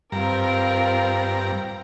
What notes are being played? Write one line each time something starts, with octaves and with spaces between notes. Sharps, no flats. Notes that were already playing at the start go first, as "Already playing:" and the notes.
G2 C4 F4 A#4 A#5